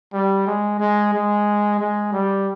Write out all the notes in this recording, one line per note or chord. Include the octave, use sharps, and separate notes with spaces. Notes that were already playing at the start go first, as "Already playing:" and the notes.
G3
G#3
G#3
G#3
G#3
G3